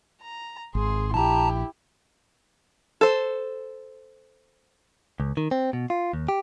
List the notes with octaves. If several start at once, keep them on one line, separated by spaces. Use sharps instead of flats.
A#5
G#1 G#4 C6
A#1 E4 G4 A5 A#5
A4 C5
C#2
D#3
C4
B2
F4
D#2
G4